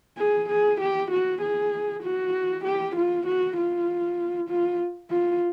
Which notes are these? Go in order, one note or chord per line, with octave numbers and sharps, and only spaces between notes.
G#4
G#4
G4
F#4
G#4
F#4
G4
F4
F#4
F4
F4
F4